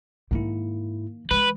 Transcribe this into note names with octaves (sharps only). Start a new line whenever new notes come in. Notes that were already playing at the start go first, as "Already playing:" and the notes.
G#2 D#3 A#3 E4
E3 G#3 B4